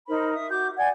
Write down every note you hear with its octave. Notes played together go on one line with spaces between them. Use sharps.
D#4 A#4 C5 B5
E5 D#6
F#4 D6 G6
D5 F#5 G#5 G#6